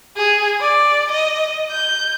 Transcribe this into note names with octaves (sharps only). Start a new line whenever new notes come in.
G#4
D5
D#5
G6